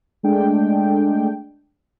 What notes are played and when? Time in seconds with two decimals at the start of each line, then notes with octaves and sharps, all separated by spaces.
0.23 G#3 A3 D4 G5